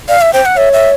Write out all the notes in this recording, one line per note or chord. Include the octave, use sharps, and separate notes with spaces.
D5 F5
E5
C5 G5
F#5
C#5 E5
E5